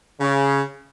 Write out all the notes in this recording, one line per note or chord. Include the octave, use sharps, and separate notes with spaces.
C#3